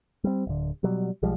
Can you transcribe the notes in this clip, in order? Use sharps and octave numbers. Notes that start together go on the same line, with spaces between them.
G3 C4
D1 D3
B2 F#3 G3
B1 F3 G3 G#3